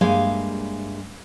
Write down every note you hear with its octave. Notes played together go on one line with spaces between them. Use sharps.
G2 G#3 A#3 E5 F5 G#5